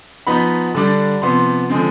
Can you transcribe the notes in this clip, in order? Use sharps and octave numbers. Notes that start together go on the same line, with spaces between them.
F3 B3 D#4 B5
D3 G3 D4
C3 F3 B3 C6
D3 F3 G#3 C4